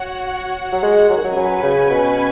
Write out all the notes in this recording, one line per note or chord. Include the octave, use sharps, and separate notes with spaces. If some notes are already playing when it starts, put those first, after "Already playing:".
Already playing: F#4 C#5 F#5
F#3
G#3
F#3
D#3
F#3
F#3 C#4 B4 G#5
C#3
B2